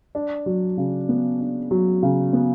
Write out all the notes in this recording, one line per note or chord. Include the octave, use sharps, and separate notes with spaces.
D4
F#3
C#3
B3
D4
F#3
C#3
B3